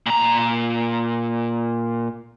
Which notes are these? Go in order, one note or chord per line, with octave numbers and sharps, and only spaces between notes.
A#2 A#5